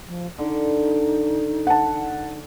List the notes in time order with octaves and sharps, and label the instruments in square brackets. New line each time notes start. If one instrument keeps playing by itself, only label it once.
[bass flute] F3
[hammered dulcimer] D3 [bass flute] D#4
[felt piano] F#5 A5